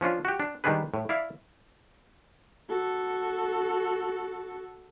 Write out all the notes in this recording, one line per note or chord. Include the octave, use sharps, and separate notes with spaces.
F3 C#4 D4 F4
F#4 G4
D4
D#3 G3 G#3 D4 G#4 B4
A2
E4 D5 E5 F5
F#4 A4